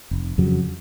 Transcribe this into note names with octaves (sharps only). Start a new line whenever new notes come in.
F1
F2 C#3 F#3